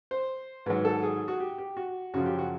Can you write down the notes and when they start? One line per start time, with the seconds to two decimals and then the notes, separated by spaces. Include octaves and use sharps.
0.11 C5
0.66 G#2 D#3 F#3 B4
0.85 A4
1.03 G#4
1.28 F#4
1.40 G4
1.58 G4
1.77 F#4
2.14 F#2 C#3 F3 F#4
2.26 G4
2.39 F#4